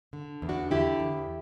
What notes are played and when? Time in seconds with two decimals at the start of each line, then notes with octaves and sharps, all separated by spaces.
0.13 D3
0.42 E2
0.49 D4 F#4
0.71 D3 E4 G4
1.00 E2